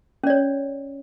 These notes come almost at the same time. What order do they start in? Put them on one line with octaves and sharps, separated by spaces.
C#4 D5 C#5